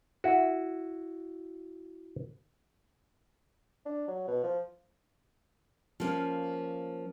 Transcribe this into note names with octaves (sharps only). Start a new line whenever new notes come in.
E4 F#4
D4
F#3
B2
F3
F3 A#3 C#4